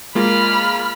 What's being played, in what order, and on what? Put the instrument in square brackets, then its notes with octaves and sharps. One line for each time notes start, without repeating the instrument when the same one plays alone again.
[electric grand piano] G#3 A#3 F4 [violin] B5 F6